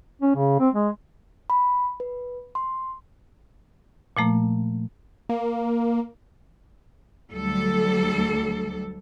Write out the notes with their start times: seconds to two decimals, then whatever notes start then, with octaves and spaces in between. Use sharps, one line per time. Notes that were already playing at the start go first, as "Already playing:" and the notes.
0.22 C#4
0.35 C#3
0.60 C4
0.74 G#3
1.50 B5
2.00 B4
2.55 C6
4.17 A#2 F3 A3 A#3
5.29 A#3
7.32 D2 F#3 G3 A4